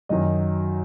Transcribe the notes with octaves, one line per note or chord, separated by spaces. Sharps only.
F#2 D#3 F#3 D#5